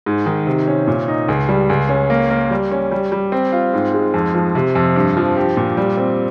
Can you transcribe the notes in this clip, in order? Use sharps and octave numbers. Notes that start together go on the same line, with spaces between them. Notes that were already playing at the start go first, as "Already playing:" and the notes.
G#2
D#3
C3
C#4
A#2
D#4
C#2
G3
C#2
C#4
A#3
A#3
G3
C#4
G3
G3
C4
F4
G#2
G#3
F2
F3
C3
F2
G2
F3
G4
A#2
G3
C4